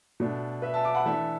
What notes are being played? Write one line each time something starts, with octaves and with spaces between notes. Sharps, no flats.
B2 A3 D4
B4 E5
E5 A5
A5 D6
F#5 B5
E3 A3 D4 E5 A5